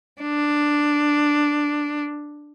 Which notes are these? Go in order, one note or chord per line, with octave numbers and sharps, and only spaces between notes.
D4